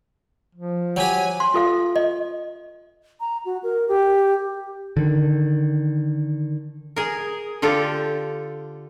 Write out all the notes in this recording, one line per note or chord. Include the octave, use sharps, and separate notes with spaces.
F3
F#3 G4 G#5
C6
F4 A4 F5
D#5
A#5
F#4
A#4
G4
D3 D#3
G#4 A#4
D3 F4 G4 A4